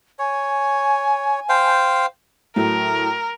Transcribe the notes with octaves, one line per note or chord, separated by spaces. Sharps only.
C#5 G#5
C5 F5 G5
A2 F#3 A3 A#4